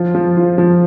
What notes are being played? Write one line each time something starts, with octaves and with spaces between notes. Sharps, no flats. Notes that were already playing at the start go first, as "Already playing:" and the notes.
Already playing: F3 F4
F3
F4
F3